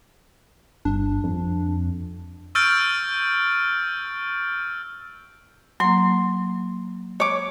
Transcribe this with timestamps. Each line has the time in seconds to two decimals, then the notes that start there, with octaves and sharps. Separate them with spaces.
0.85 G1 D4
1.24 F2
2.55 C#6 E6 F6 G6 A6 D7
5.80 F#3 A#3 C6
7.20 C#5 D6